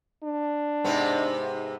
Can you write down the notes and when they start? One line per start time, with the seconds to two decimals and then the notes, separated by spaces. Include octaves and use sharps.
0.24 D4
0.84 G#2 C3 B3